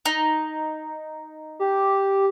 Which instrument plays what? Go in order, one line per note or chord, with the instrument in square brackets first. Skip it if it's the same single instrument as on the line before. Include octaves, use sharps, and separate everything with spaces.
[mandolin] D#4
[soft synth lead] G4